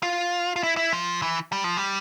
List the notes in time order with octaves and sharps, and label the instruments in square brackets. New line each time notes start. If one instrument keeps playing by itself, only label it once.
[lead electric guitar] F4
F4
E4
E4
F3
E3
G3
F3
G3